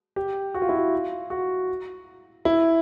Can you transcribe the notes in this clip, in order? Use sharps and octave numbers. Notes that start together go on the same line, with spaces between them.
G4
F#4
F4
E4
F4
F#4
E4